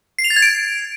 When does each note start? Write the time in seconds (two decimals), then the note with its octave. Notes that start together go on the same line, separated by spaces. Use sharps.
0.19 C7
0.24 F7
0.30 A6
0.36 G#6
0.42 D7